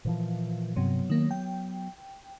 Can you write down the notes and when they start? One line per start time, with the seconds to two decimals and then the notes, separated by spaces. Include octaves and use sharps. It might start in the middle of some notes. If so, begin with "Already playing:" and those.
0.05 A#2 E3 F3
0.76 G2 C3 F#3 B3
1.10 D#3 A#3
1.31 G5